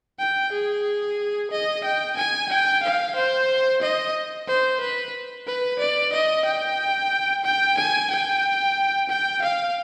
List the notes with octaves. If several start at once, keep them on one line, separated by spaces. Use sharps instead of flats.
G5
G#4
D#5
G5
G#5
G5
F5
C5
D#5
C5
B4
B4
D5
D#5
G5
G5
G#5
G5
G5
F5